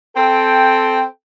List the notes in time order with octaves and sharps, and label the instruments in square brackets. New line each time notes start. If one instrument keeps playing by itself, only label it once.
[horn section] C4 A4 G5